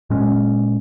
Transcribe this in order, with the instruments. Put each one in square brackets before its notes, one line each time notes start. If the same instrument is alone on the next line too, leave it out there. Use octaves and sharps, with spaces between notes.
[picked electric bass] A#2 G#3 C#4